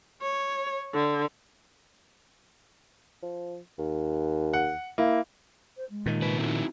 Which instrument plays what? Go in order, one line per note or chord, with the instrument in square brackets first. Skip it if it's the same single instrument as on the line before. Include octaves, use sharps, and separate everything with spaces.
[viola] C#5
D3
[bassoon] F3
D#2
[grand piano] F#5
[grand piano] A#3 [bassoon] E4
[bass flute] C5
G#3
[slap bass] A#2 D#3
[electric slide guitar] C3 B4
[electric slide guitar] C4 E4 F#4 [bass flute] D#4